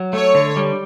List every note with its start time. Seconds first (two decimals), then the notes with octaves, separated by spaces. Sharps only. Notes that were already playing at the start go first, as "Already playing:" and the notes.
Already playing: F#3
0.13 A3 C#5
0.35 D3
0.56 G3